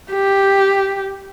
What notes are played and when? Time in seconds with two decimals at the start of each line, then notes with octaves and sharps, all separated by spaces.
0.11 G4